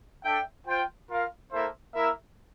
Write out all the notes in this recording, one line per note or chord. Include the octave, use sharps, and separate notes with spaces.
D4 A4 E5 G5
F4 C5 G5
F4 A#4 F5
A#3 E4 A4 C5 E5
A#3 E4 A#4 E5